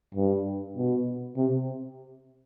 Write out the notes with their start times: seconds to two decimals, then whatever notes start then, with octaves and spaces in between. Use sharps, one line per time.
0.15 G2
0.76 B2
1.37 C3